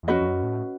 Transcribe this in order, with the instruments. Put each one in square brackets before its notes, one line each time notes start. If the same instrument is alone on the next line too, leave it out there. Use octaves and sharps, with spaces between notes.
[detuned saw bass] E2
[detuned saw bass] F2 [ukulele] C#4 F#4 B4 D#5
[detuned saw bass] F2
F#2
A2